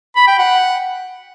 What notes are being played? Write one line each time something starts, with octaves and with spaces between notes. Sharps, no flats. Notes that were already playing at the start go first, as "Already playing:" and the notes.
B5
G5
F#5